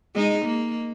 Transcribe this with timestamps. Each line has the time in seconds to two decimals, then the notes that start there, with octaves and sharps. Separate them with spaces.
0.15 G#3 D#4
0.45 A#3